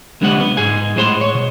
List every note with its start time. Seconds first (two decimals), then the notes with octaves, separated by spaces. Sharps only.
0.21 C2 D3 G3 G#3 B3 F#5
0.40 B3
0.57 G#2 G#4 G#5
0.96 A2 G#3 G#4 C5 F#5 C6
1.21 C#5
1.35 B2